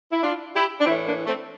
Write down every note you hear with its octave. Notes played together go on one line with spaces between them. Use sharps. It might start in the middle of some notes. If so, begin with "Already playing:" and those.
E4
D4 F4
E4 G4
D4
A2 E3 C4 E4
A#3 D4
A3 C4